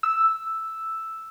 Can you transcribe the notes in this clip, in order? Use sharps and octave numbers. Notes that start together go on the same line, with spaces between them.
E6